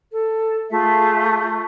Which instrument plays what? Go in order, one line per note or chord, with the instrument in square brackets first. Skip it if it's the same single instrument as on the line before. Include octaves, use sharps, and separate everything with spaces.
[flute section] A4
[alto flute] A3 [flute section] F4 G#4 E5